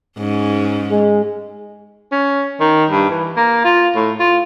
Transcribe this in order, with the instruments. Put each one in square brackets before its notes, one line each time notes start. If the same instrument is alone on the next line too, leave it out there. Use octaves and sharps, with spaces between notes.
[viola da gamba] G#2 C#4
[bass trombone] G#3
[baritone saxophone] C#4
D#3
G2
E3
A#3
F4
A2
F4